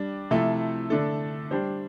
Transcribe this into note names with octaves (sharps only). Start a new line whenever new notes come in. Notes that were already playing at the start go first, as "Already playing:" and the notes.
Already playing: G3 D4
C3 F3 A3 E4 A4
D3 A3 D4 A4
G3 D4 G4 C5